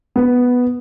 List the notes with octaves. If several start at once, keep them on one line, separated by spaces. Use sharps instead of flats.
B3